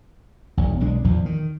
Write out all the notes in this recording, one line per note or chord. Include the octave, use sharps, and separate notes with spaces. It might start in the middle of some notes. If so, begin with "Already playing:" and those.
E1 B1
B1 G#3 D4
A#1 E2 E3 F3
D#3